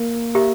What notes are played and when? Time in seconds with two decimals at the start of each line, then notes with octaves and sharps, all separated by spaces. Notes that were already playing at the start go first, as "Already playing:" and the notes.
Already playing: A#3
0.35 G4 A#4 E5 A#5